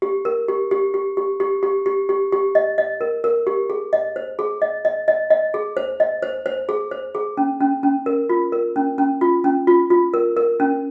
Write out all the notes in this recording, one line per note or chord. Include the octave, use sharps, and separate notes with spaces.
G4
A#4
G4
G4
G4
G4
G4
G4
G4
G4
G4
D#5
D#5
A#4
A#4
G4
G#4
D#5
C5
G#4
D#5
D#5
D#5
D#5
G#4
C5
D#5
C5
C5
G#4
C5
G#4
C#4
C#4
C#4
A#4
F4
A#4
C#4
C#4
F4
C#4
F4
F4
A#4
A#4
C#4